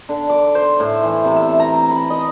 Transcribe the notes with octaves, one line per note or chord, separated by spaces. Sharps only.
D3
D6
C5
A2
E3
C3
E5
A#5
B5
D#5